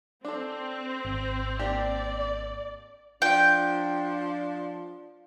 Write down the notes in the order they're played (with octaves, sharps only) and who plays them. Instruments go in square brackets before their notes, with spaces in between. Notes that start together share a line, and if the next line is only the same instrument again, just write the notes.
[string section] C4 [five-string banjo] D4 A4
[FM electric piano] G#1
[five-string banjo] A#3 D4 G4 [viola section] D5
[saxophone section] F3 D4 [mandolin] G5